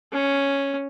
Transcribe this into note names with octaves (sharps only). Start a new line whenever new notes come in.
C#4